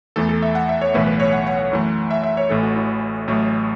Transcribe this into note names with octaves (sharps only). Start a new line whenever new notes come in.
E2 E3 A3 A4
A4
E5
F#5
E5
C#5
B1 A2 E3 A3 B4
B4
C#5
F#5
F#5
F#5
F#2 E3 A3
E5
E5
C#5
A1 A2 E3 A3 A4
F#4
E4
A1 A2 F#3 A3